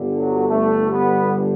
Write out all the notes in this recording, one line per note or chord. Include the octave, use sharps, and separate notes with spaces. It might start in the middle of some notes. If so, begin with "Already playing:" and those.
Already playing: G1 G2 D3
F#3
A3
B3